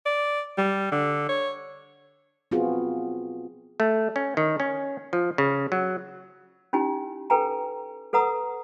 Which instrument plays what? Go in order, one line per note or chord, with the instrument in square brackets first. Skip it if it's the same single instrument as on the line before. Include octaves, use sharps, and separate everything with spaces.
[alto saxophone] D5
G3
D3
C#5
[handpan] B3 C4 F4 F#4 G#4
[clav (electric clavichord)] A3
C#4
D#3
C#4
F3
C#3
F#3
[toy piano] C#4 D#4 E4 G4 G#5
A4 B4 G5 G#5 A#5
A4 B4 F#5 A#5 D#6